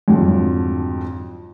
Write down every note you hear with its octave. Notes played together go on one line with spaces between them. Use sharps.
F2 G#2 D3 F3 F#3